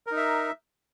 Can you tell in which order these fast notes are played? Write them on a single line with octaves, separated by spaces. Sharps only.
A#4 D#4 E5